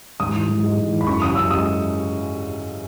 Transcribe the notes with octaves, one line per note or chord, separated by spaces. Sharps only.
G#2 D#6
E3
G#2
G#3
G#2
E3
B5
F#2 C#6
C#3 D#6
F#2 E6
G#3 D#6